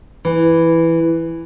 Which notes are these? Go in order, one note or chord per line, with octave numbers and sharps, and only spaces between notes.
E3